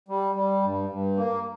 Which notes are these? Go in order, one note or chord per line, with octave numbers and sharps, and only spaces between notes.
G3
G3
G2
G2
A#3